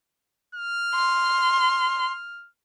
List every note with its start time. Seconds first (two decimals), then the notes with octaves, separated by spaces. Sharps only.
0.55 F6
0.96 C6